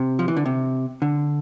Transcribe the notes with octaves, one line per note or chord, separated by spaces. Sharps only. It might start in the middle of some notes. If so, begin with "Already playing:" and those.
Already playing: C3
F3
E3
D3
C3
D3